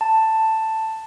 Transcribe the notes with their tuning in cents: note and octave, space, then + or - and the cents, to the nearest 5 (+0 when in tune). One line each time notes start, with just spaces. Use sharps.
A5 +10